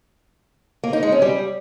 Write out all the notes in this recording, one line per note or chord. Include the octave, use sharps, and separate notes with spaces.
A#3
D#4
G#3
C#4
G3